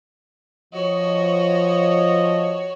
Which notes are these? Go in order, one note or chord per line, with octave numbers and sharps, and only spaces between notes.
F3 F#4 C#5 D#5